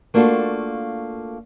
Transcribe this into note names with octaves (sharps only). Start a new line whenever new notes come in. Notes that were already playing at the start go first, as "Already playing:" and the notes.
A3 A#3 D4 F4 F#4 A4